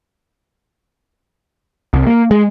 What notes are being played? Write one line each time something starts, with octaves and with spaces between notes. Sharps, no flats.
C2
A#3
G#3